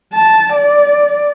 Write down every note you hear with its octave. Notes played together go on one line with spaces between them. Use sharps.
A5
D5